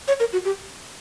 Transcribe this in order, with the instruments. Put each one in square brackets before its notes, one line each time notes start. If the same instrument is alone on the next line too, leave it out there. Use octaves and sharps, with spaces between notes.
[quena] C#5
A#4
F#4
G4